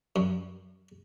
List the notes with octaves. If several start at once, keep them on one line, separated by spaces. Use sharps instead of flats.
F#2